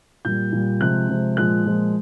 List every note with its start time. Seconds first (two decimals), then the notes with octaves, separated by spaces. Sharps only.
0.25 A#2 G3 G6
0.52 A#2 G3
0.81 C3 F3 G#3 F#6
1.09 C3 F3 G#3
1.37 A#2 F3 G#3 F#6
1.65 A#2 F3 G#3